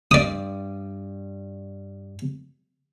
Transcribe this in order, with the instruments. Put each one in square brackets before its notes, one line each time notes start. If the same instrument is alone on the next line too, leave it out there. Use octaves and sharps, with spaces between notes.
[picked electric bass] G2 [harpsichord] D5 D#6